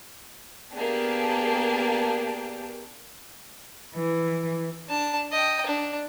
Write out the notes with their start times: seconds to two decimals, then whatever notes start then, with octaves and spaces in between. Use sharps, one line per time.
0.74 A#3 B3 D4 G4 G#4 A5
3.95 E3
4.89 D4 A5
5.32 D#5 G5
5.66 D4